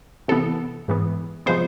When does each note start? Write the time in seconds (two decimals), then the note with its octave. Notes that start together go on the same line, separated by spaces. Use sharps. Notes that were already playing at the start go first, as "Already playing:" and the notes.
0.28 C3 E3 B3 A4
0.88 G#2 E3 B3
1.46 C3 F3 G#3 B3 C5